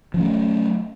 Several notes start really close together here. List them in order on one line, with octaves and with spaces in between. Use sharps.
F3 C#4 A3 F#3